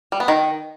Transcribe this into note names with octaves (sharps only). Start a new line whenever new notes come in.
G3
B3
D#3